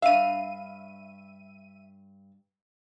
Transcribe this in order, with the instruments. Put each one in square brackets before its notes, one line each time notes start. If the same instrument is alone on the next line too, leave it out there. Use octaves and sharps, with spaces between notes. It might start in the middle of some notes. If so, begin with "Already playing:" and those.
[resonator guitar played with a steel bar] G2 F5 [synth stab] E5 D#7